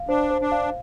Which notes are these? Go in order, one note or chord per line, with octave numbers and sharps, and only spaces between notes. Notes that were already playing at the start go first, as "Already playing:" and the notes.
Already playing: F5
D4 C5
C5
D4
F5